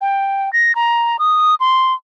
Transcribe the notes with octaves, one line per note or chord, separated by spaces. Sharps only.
G5
A#6
A#5
D#6
C6